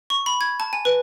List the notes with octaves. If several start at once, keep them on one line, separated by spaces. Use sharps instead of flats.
C#6
B5
G#6
A5
G#5
B4